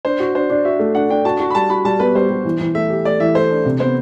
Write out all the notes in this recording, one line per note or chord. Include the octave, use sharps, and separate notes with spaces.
D4 C5
F#4
D4 C5
D4
F#4 E5
A3
D4 F#5
D4 G5
F#4 A5
F#4
B5
G3 A5
F#4 B5
G3 A5
B3 B4
G3 C5
G3
E3
E3
A3 E5
G4
A3 D5
E3 E5
A3 C5
D4
C3
B3 C5